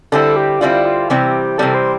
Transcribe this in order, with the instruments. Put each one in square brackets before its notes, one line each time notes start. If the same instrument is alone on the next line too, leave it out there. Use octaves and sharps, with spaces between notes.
[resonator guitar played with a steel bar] D3 G3 C4 E4 [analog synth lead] A4
[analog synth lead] G4
[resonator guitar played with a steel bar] D3 G3 C4 E4 [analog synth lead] F4
[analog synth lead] F4
[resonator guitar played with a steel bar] C3 E3 G3 C4 [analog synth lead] G4
[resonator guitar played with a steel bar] C3 E3 G3 C4 [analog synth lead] A4
[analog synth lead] C5